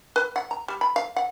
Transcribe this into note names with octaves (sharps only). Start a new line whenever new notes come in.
B4
F#5
A#5
G3
B5
F5
F#5